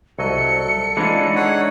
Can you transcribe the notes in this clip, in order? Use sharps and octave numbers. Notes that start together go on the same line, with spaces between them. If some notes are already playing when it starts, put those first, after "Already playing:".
C2 F#3 A4 D#5 C#7
E3 G#3 D4 D#4 F4 C#5
E4 G#4 C#5 F#5